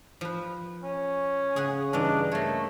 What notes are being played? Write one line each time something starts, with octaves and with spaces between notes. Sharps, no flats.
F3 B4
C#4
C#3 G#4 C#5 F#5
G2 E3 D4 D#4
A3 A#3 C#5